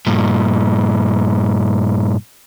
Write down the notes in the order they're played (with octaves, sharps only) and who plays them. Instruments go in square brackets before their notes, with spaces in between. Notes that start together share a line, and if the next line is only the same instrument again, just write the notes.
[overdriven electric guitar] G2 A#2